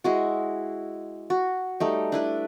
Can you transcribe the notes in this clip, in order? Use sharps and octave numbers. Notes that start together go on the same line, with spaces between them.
G#3 E4 F#4
F#4
G3 A3 D#4
D4 E4 B4